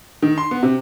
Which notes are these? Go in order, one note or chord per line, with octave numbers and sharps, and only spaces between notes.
D#3
C6
B3
C3